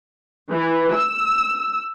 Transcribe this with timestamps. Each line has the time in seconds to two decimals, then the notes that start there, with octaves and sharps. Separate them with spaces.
0.50 E3
0.94 E6